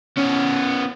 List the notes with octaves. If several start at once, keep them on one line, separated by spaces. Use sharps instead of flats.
B3 C#4